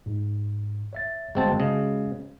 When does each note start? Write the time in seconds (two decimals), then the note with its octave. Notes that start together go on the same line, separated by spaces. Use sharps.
0.06 G#2
0.93 C#5 E5 A6
1.35 G1 G#3 C4 F#4 A5
1.60 C#3 D#5